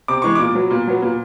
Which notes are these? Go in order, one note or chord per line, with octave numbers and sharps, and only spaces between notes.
C3 D6
E3 G#3 C#6
A#2 D6
F#3 B3
A#2
F#3 B3
A#2